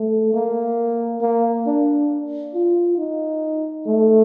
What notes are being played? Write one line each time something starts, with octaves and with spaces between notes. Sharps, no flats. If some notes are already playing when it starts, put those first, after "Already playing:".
Already playing: A3
A#3
A#3
D4
F4
D#4
A3